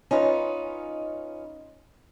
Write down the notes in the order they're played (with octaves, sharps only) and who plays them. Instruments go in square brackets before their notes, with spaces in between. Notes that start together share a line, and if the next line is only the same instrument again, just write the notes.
[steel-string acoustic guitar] C#4 D#4 F4 B4